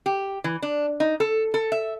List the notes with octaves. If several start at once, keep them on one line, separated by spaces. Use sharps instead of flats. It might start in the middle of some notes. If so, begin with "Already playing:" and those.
G4
E3
D4
D#4
A4
A4
E5